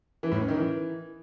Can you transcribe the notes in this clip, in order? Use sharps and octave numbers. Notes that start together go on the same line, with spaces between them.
E3
A2
C#4
D#3
E3